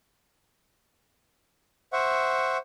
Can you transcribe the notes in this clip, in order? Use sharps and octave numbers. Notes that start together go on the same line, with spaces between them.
C5 E5 F#5 C#6